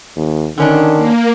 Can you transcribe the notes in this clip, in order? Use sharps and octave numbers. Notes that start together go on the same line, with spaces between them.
D#2
D3 D#3 C#4 D4
A#3